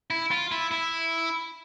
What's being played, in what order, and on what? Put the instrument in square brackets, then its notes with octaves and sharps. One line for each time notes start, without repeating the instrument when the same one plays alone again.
[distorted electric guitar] E4
F4
E4
E4